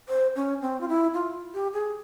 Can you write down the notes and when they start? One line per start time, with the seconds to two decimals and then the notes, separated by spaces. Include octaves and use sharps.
0.09 C5
0.36 C#4
0.61 C4
0.81 F4
0.88 E4
1.14 F4
1.54 G4
1.73 G#4